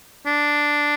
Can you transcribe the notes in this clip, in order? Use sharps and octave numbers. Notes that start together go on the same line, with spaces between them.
D4